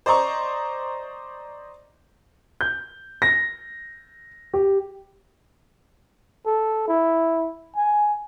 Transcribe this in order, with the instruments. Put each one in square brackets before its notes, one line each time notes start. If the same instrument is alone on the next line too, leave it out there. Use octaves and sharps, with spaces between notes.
[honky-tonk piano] C5 D5 D#5 A#5 C#6
[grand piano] G6
A#6
G4
[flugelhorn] A4
E4
G#5